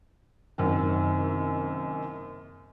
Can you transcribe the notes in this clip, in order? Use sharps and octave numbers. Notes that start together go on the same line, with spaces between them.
F#1 F#2 C3 D#3